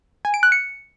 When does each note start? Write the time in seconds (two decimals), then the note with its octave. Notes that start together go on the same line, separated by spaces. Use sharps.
0.25 G#5
0.34 D7
0.43 F#6
0.52 C#7